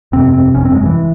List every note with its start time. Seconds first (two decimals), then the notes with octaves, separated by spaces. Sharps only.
0.12 G1 F2 C3 C4
0.33 C4
0.54 G1 F2 C3 C#4
0.65 C4
0.75 G#3
0.86 E3